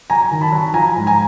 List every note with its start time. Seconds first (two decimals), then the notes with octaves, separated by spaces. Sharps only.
0.10 F#3 G#5 A#5
0.31 D#3
0.41 A5 B5
0.52 F#3
0.74 F3 G#5 A#5
0.96 G#2
1.07 G#5 A#5